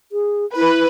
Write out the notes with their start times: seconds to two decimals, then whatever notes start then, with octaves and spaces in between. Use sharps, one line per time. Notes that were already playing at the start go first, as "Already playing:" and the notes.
0.12 G#4
0.56 E4 B4